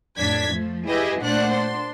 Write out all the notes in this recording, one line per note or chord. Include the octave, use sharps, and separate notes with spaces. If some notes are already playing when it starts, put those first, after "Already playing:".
F2 A2 D4 G#6 B6
F3 A3
E4 G4 G#4 B4 D#5 E5
A#2 A3 D4 C5 F#5 F#6
D4 C6